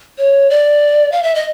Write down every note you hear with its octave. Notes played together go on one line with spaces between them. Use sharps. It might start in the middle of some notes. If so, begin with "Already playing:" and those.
C#5
D5
F5
E5
D#5